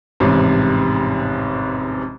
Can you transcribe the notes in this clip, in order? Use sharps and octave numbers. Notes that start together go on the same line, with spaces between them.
A1 F2 G#2 C3